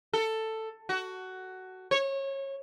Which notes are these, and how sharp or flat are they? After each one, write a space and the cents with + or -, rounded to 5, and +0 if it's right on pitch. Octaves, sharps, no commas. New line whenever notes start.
A4 +10
F#4 +15
C#5 -25